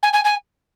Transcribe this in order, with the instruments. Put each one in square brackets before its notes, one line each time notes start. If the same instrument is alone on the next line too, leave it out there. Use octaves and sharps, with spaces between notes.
[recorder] G#5
G#5
G#5